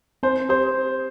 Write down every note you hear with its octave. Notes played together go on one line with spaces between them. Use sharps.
C4 C5
G4 C5